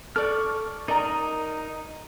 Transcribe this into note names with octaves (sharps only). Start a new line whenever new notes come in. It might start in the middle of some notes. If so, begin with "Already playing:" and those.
A4 D5 C#6 D6 F6
D#4 A#4 D5 D#5 A#5